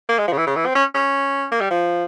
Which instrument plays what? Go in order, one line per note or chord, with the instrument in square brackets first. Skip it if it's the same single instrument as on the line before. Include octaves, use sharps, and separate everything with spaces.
[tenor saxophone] A#3
G#3
F3
C#3
E3
C#3
E3
C4
C#4
C#4
A#3
G3
F3